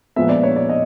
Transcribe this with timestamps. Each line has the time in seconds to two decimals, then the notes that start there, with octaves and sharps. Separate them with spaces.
0.16 A#2 F3 G#3 B3 E5
0.29 D5
0.43 C#5
0.56 D5
0.69 D#5